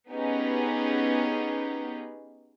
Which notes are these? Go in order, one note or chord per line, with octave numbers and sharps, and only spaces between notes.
B3 C#4 D#4 G4 G#4 B4